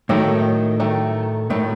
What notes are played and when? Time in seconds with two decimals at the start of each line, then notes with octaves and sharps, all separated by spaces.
0.09 A2 D#3 F#3 A3
0.80 D#3 F#3 A3
1.50 A2 D#3 F#3 A3